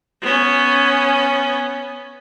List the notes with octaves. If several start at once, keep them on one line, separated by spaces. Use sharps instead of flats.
B3 C#4